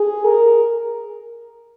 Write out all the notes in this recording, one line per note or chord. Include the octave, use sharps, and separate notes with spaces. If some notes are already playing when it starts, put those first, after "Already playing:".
Already playing: G#4
A#4